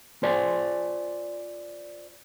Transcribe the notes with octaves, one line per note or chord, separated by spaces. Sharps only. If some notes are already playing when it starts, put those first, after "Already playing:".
F4 C5 D5 G#5